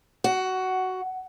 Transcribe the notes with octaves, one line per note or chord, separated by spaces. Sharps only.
F#4